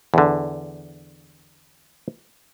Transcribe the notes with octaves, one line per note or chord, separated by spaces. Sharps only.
E2 D3